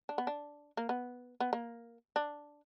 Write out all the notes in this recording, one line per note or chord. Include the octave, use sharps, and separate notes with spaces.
D4
B3
D4
A#3
B3
B3
A#3
D4